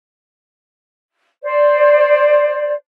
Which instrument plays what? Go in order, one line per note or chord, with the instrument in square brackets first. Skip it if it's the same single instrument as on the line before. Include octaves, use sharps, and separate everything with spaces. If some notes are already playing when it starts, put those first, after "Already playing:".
[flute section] C5 D5